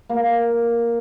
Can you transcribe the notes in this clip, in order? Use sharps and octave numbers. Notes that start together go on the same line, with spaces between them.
A#3